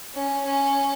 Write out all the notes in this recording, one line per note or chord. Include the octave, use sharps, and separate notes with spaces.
C#4
C#4